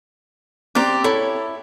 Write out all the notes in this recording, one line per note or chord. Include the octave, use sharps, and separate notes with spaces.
C4 G4 D5 A#5 F#6
E4 A4 C#5 B5